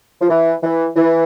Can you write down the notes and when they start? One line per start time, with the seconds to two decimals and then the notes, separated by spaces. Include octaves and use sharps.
0.21 F3
0.30 E3
0.63 E3
0.97 E3